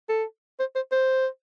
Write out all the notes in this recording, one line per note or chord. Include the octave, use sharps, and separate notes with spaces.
A4
C5
C5
C5